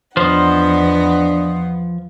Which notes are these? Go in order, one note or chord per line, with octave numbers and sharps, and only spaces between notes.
E2 F3 B3 D4 C5 D#5 F#5